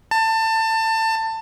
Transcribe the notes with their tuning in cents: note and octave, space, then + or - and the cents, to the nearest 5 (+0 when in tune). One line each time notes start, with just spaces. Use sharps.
A5 +25